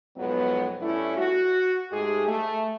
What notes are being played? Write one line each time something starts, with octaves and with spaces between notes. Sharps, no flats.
F2 G#2 B2 F#3 B3
G2 A3 C#4 D4 E4
F#4
G#2 G#3 A3 G4 G#4
A3